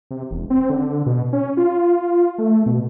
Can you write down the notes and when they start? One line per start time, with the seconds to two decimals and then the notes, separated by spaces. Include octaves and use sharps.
0.11 C3
0.31 E1
0.50 C4
0.70 D3
1.06 B2
1.33 C#4
1.57 F4
2.38 A3
2.66 B2